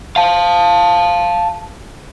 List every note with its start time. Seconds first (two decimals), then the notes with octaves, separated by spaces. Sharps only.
0.16 F5 A5